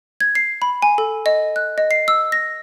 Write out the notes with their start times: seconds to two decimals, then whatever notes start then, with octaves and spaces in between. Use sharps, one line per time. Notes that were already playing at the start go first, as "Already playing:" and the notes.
0.20 G#6
0.35 C7
0.62 B5
0.82 G#5
0.98 A4
1.26 D#5
1.56 F#6
1.78 D#5
1.91 C7
2.08 E6
2.32 A#6